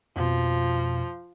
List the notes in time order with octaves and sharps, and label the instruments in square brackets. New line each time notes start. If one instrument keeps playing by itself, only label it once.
[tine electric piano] F2 B2 [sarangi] F3